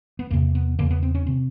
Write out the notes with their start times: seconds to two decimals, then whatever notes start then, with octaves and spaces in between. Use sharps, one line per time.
0.19 B3
0.31 E2 C3 A#3
0.55 B3
0.79 E2 C#3 A#3
0.91 B3
1.03 C4
1.15 C#4
1.27 C3 C4